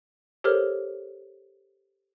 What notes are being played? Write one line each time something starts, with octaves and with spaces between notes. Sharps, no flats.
G4 A4 A#4 C5 C#5 F6